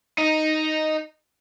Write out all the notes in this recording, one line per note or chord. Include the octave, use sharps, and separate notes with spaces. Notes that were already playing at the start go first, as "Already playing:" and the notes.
D#4